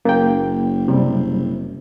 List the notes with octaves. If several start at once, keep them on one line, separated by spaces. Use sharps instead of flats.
F#1 A#3 G5
C3 G3